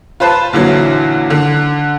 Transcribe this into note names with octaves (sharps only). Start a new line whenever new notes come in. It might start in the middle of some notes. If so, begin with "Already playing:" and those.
F4 B4 C5 A5
A#1 D3 E3 F#3
D3